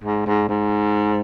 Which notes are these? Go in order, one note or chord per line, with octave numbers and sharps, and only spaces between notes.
G#2
G#2
G#2